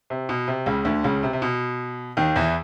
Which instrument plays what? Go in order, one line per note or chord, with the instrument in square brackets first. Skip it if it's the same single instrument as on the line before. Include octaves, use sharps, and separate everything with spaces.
[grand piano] C3
B2
C3
C#2 C#3
D2 D3
C#2 C#3
C3
C3
B2
D#2 D#3
E2 E3